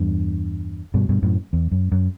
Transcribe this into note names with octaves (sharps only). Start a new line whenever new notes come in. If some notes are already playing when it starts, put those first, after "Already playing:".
Already playing: E2 G2
G2 B2
G2 B2
F#2 A2
E2
F#2
F#2